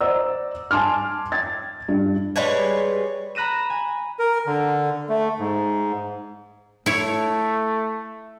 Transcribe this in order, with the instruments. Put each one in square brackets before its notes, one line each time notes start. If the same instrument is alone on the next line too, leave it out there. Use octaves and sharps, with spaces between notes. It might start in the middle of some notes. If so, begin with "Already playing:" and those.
[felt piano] C5 D5 D#5 F#5 A#5 E6
G#5 A5 C6 D6 F6
G5 G#6 A6
G2
[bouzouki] G3 G#3 B4 C#5
[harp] A#5 B5 F#6 A#6 D#7 E7
G#5
[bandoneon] A#4
D3
A3
G#2
[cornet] A3 [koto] E4 C#5